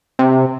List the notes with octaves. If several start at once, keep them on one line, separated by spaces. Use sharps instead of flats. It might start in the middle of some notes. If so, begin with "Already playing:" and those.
C3